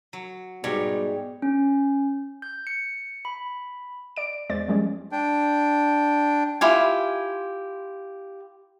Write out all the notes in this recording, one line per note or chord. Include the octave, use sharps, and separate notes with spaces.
F#3
G#2 B2 G3 C#5 A#5
C#4
G6
C#7
B5
D5 D7
E2 G#3 C5 D5 A6
F3 G3 G#3 C#4
D4 G5
E4 F4 G4 G#5